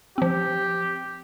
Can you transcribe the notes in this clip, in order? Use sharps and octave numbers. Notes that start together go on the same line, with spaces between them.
F3 C4 G4